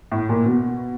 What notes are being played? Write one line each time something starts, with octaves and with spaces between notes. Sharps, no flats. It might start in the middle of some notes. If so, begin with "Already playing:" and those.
A2
A#2
B2